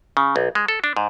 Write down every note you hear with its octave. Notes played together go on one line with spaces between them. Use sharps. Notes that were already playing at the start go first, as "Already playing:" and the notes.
C#3
B1
G#3
A4
D4
G#2